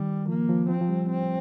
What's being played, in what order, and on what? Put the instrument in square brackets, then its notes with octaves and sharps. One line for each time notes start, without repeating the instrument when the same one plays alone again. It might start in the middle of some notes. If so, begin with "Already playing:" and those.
Already playing: [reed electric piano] D#3 [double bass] G3
[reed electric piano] F3 [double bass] A#3
[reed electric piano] F3
[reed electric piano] F3 [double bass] C4
[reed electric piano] F3
G3
[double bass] C4